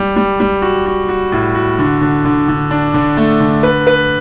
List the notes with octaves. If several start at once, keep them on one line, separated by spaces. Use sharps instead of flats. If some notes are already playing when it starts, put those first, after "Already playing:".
Already playing: G3
G3
G3
F#4
F#4
F#4
A2
F#4
D3
D3
D3
D3
D4
D3
A3
D3
B4
B4